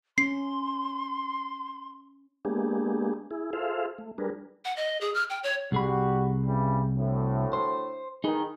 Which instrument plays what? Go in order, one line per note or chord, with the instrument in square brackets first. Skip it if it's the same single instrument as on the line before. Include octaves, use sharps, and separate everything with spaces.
[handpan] C#4 [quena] C6 [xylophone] C7
[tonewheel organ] G#3 A#3 B3 D4 G4 G#4
E4 G#4
F4 G#4 A4 C5 E5 F5
A3
G3 D4 G#4 A#4 B4
[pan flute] F#5
D#5
G#4
F6
G5
C#5
[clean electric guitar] C2 G#4 B5 [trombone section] G3 F#4
[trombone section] C#3 E3 G3
D2 A2
[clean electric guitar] C5
[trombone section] D#3 [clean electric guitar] D#4 G#4 B4